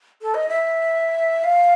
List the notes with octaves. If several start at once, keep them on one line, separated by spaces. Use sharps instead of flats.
A4
D#5
E5
F5